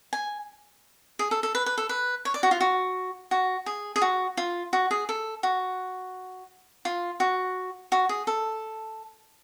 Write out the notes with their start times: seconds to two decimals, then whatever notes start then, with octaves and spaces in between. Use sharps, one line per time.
0.13 G#5
1.19 G#4
1.31 A4
1.43 A4
1.55 B4
1.66 B4
1.78 A4
1.89 B4
2.25 C#5
2.34 D5
2.43 F#4
2.51 F4
2.60 F#4
3.31 F#4
3.66 G#4
3.96 G#4
4.02 F#4
4.37 F4
4.73 F#4
4.91 G#4
5.09 A4
5.43 F#4
6.85 F4
7.20 F#4
7.92 F#4
8.09 G#4
8.27 A4